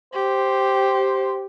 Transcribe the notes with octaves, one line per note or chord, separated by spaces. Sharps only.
G4 C5